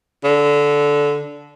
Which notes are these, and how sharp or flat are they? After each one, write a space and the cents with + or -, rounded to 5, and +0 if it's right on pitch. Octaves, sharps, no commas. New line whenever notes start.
D3 -15